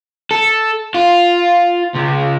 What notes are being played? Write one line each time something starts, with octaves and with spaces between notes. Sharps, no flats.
A4
F4
C#2